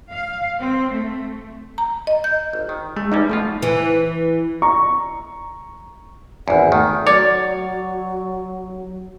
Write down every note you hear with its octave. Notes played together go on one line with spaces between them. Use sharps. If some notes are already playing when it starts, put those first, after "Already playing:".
F5
C4
A3
A#5
D#5
G6
G#1
D#3
G#3 A3
E2 G3 C#4 D#4
B2 F3 A3 F4
E3
A#5 C#6
G#1 E2 F#5
D#3 A3
F#3 C#5 D5